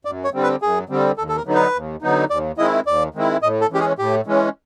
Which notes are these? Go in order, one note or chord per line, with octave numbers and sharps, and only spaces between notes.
F#2 D5
C#5
D3 G3 C4
B4
F#2 G#4
D3 G3 C4
D#2 A4
A4
A#4
D3 F#3 B3 D#4
B4
D#2
D3 F#3 B3 D#4
D#2 D5
D#3 G#3 C4 E4 D#5
D#2 D5
D#3 G#3 C4 E4
A2 D#5
A4
E3 G#3 C#4 G4
G#4
A2 G4
E3 G#3 C#4